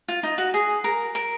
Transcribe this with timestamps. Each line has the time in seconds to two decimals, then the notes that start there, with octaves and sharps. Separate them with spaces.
0.08 F4
0.23 D#4
0.38 F#4
0.54 G#4
0.84 A#4
1.15 A#4